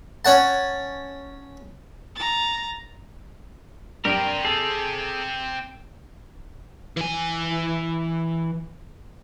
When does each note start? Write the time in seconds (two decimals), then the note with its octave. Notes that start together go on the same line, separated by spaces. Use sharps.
0.25 C#4 C#5 F#5 A5
2.15 A#5 A6
4.05 G2 C4 G4 A#4 G5
4.45 G#4 A4 C7
6.97 E3 G#5